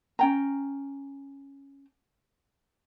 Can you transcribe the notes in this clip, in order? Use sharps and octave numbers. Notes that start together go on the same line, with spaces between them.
C#4 G5 A#5